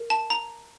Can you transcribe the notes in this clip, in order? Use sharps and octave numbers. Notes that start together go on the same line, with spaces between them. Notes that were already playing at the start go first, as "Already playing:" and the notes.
Already playing: A#4
A5
A#5